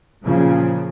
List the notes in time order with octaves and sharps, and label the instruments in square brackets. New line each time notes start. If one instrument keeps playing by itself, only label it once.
[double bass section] A#2 C#3 F3